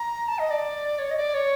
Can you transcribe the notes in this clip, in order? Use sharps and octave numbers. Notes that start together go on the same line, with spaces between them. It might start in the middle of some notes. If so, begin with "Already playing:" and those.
Already playing: A#5
A5
D#5
D5
C#5
D#5
D5
C#5